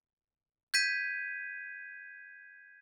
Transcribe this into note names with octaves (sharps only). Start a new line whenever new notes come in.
G6 G#6 B6 D#7